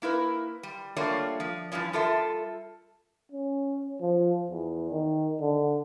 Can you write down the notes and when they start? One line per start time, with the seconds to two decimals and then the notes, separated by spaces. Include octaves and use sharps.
0.02 A#3 E4 A#4 B4
0.63 G3
0.96 G3 A3 A#3 D4 F4 C#5
1.40 F3
1.72 G2 A#2 E3 F3 C#4
1.93 G3 F4 A4 A#4 E5
3.32 C#4
4.01 F3
4.50 E2
4.91 D#3
5.40 D3